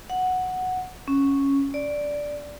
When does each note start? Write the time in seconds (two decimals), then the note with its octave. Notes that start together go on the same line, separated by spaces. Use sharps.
0.10 F#5
1.08 C#4
1.74 D5